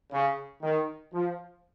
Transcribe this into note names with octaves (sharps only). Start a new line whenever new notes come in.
C#3
D#3
F3